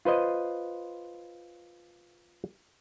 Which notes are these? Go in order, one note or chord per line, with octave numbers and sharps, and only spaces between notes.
F4 B4 C5 D#5